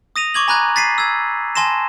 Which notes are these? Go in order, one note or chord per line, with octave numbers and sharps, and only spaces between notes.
D#6 A#6 D#7 F7
C#6 D6 G#6 F#7
G#5 A#5 B5 F#6 G#6
A6 B6 C7 D#7
E6 G#6
G#5 A5 C6 A#6 E7